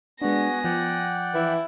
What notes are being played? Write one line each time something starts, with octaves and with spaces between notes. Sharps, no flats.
G#3 B3 D4 F#4 G#5 A#6
F3 D5 F#5 G5
E3 E4